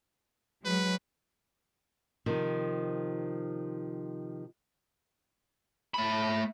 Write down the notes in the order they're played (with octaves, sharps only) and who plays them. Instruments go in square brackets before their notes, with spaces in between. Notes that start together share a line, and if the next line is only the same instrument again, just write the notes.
[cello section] F#3 G#3 [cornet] B4
[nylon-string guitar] C3 D#3 F3
[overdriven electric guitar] A3 B5